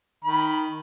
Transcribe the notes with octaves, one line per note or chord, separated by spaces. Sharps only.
D#3 B5